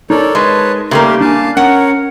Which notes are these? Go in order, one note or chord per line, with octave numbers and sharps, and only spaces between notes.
D#4 A4 A#4 C#5 D5
G#3 B4 C#5 A5
C#3 G3 A3 A#3 G4 C6
D4 F5 G#5 A5
C#4 A#4 C#5 F#5